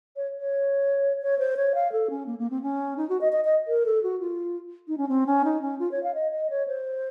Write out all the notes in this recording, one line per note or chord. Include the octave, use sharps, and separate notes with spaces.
C#5
C#5
C#5
C5
C#5
F5
A4
C#4
A#3
A#3
C4
C#4
D#4
F#4
D#5
D#5
D#5
A#4
A4
F#4
F4
D#4
C#4
C4
C#4
D#4
C#4
F4
C#5
F5
D#5
D#5
C#5
C5